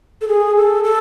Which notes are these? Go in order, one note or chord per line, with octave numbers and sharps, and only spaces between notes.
A4
G#4
A4
A4